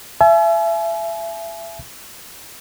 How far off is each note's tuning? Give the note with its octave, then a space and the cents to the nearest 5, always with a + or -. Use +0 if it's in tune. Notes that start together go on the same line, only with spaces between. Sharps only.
E5 +30 G#5 +40